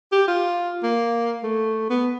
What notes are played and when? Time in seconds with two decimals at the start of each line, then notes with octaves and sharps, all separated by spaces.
0.12 G4
0.28 F4
0.83 A#3
1.43 A3
1.90 B3